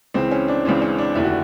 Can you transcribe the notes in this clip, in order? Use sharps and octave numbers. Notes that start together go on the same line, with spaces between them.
C#2 C#3 E3 C4
C#4
D4
C#2 C#3 E3 C4
C#4
D4
F1 D#2 D3 E4
F#4